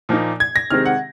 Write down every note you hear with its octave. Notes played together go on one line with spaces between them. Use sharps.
A#2 F3 A#3 D#4
G#6
A#6
C3 D#3 G#3 C4 F6
F#5